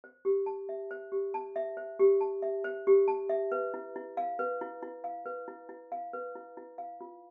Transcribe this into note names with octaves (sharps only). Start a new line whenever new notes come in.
C5
G4
A5
E5
C5
G4
A5
E5
C5
G4
A5
E5
C5
G4
A5
E5
B4
E4
E4
F5
B4
E4
E4
F5
B4
E4
E4
F5
B4
E4
E4
F5
F4